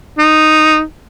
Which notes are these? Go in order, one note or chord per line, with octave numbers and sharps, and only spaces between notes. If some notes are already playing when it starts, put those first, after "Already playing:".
D#4